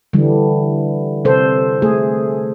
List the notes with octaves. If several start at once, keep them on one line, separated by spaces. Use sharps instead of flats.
D3 E3 G3
C3 A4 C5
A3 G#4